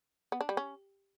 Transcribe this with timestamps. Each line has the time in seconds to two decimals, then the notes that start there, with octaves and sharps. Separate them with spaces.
0.32 B3
0.41 D4
0.49 G3
0.57 C#4